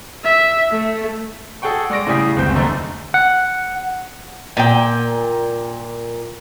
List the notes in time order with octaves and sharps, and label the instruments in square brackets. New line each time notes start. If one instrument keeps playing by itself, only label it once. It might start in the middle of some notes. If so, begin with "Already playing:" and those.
[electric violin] E5
A3
[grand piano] F#4 G#4 A4 F#5 G5 C#6
G#3 D5 C#6 A#6 D7
A2 C#3 G3 G#5 D#6 B6
G1 C#2 C4 G6
F1 D#2 D3 A3 D#5 A#5
[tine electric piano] F#5
[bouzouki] A#2 G5